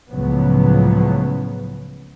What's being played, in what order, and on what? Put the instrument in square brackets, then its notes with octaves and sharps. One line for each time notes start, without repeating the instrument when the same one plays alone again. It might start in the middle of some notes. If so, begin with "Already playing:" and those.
[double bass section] C#2 A2 C#3 F3 F#3 B3